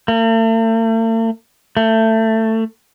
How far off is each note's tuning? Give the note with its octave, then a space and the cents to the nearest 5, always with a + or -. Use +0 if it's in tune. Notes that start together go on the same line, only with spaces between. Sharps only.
A3 +45
A3 +20